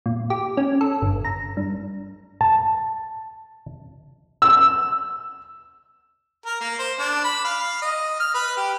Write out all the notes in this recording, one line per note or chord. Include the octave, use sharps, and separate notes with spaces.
A#2
G4
C#4
A4
G1
A#5
G2
A5
E6
A#4
A#3
C5
D4
B5
F5
D#5
F6
B4
G4